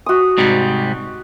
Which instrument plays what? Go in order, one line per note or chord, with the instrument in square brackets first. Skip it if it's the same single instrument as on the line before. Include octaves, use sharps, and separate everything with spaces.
[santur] F#4 D#6
[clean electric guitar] G#2 C3 G3